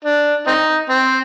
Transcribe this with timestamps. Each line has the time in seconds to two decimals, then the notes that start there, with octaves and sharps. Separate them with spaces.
0.05 D4
0.47 C4 D#4
0.89 C4